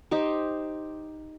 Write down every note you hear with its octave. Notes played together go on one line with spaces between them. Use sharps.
D#4 G4 C5